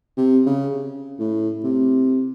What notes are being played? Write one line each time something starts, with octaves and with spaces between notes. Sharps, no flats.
C3
C#3
A2
C3